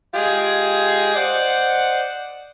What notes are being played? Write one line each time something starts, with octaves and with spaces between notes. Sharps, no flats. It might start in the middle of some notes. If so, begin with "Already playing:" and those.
G#3 F4 G4 G#4
C5 D5 D#5 F#5